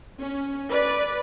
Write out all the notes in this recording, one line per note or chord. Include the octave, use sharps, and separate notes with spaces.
C#4
B4 D5